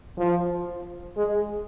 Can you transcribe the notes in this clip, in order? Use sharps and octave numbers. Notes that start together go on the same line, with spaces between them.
F3
G#3